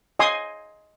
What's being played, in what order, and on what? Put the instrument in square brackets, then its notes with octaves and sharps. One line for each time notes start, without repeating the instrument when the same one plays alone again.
[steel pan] D#5 G#5 C6 D#6